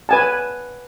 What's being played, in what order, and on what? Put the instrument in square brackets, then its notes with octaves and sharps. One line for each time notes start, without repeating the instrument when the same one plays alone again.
[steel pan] B4 G#5 A5